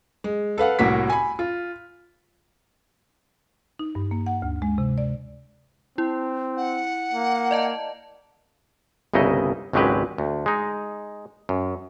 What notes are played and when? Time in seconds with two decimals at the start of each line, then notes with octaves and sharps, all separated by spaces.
0.24 G#3
0.58 A4 B4 F5 F#5
0.79 C2 A2 A#3 F#4 B6
1.10 G#5 B5
1.39 F4
3.79 D#4
3.95 G2
4.11 A#3
4.26 F#5
4.42 D2
4.62 G#3
4.78 C3
4.98 D5
5.98 C4 E4
6.57 F#5
7.13 A#3
7.51 D5 D#5 A5
9.14 G1 C2 C#3 D#4 E4 D#5
9.73 G#1 C#2 F#3 G#3 G4 B4
10.18 D2
10.46 G#3 D#4
11.49 F#2